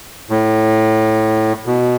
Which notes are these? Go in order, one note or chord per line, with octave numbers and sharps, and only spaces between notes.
A2
B2